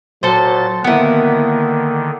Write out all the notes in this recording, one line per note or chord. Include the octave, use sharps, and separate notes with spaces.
A#2 F#3 A4 C5 A6
D3 D#3 A#3 B3 E4